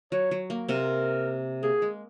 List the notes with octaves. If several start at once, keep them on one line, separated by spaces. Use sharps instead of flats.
F#3 C#5
F#3
A#3
C3 C4 A#4
A#3 G#4
G#3